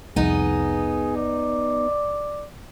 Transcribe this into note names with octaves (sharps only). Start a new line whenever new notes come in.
C2 F2 B3 D#4 G#4
D5